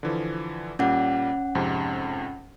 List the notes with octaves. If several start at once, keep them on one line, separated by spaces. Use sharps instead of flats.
D3 E3 F3
A#2 G3 C#4 F#5
F2 G#2 C3